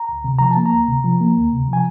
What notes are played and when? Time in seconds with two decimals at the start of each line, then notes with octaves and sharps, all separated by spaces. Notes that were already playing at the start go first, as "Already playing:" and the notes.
Already playing: A#5
0.09 D2
0.24 C3
0.39 F3 A#5
0.51 A5
0.57 A#3
0.66 A#5
0.73 D2
0.88 C3
1.04 F3
1.21 A#3
1.36 D2
1.52 C3
1.68 F3
1.73 G#5